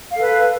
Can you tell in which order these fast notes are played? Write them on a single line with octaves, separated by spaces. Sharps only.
F5 A4 B4